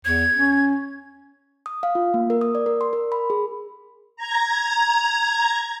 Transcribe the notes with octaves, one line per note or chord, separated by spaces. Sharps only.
E2 G#6
C#4
D#6
F5
F4
A#3
A#4
D#6
D5
A#4
C6
A#4
B5
G#4
A#5 G#6